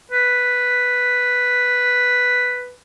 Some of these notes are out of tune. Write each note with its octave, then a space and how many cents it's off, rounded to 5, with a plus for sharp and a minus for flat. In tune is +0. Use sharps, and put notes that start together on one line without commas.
B4 +0